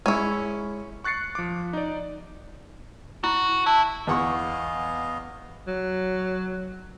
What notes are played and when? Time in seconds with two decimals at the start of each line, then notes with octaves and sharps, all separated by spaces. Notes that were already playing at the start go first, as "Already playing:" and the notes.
0.06 G#3 C#4 E4 C#6
1.04 C#6 F#6 A6 C7 C#7
1.35 F3 D6
1.73 D#4 D5
3.24 E4 F#4 B5
3.66 E4 A5
4.07 E2 B3 D#5 F5 F#5 C#6
5.67 F#3